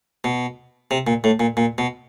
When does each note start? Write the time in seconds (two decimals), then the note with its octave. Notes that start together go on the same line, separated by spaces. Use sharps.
0.24 B2
0.91 C3
1.07 A#2
1.24 A2
1.40 A#2
1.57 A#2
1.78 B2